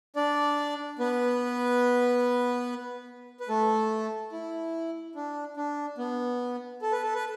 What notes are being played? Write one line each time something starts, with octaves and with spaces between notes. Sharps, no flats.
D4 D5
B3 B4
B4
A3 A4
E4
D4
D4
B3
A4
B4
A4
B4